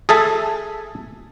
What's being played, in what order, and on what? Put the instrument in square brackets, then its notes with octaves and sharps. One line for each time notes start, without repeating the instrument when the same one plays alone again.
[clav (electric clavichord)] G#4 A4 E5 A5